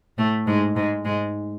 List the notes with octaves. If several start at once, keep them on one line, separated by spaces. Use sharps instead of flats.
A2 A3
G#2 G#3
G#2 G#3
G#2 G#3